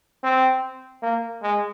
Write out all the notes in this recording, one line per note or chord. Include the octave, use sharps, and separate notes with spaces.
C4
A#3
G#3